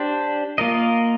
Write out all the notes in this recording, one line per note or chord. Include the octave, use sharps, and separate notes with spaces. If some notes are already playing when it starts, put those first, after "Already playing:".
Already playing: D4 G4 C5
A#3 F4 A#4 D#5